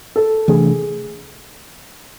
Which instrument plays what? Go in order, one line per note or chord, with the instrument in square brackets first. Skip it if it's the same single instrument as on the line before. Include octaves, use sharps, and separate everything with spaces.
[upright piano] A4
[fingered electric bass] C3 E3 A3 D4 [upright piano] G#4